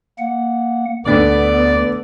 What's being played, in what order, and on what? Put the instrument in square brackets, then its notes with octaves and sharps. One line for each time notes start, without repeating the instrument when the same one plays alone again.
[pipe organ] A#3 F#5
[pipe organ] D2 [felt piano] D3 A3 B4 [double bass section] B3 [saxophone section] D5